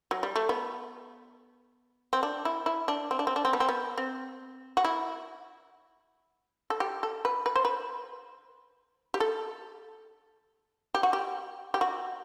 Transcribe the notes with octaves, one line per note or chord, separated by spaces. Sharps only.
F#3
G3
A3
B3
C4
D4
E4
E4
D4
C4
D4
C4
D4
C4
B3
C4
B3
C4
F#4
E4
A4
G4
A4
B4
B4
C5
B4
G4
A4
G4
F#4
G4
G4
F#4